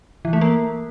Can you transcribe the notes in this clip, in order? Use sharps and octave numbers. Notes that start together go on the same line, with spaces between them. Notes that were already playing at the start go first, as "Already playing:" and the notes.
E3
A3
A#3